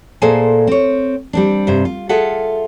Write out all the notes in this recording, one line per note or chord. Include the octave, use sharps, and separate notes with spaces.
A#2 E4 G#4 A4 C5 G#5
C4 C#5
G3 C4 D4
G2 C3 C5
F4
F4 G#4 A4 E5 F#5